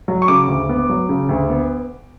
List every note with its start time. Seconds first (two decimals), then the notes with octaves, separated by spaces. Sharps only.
0.08 F#3
0.22 C#6
0.28 C#3 D6
0.48 D2
0.69 B3
0.89 F#3
1.09 C#3
1.29 D2
1.50 B3